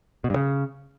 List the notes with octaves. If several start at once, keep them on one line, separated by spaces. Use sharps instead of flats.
B2
G2
C#3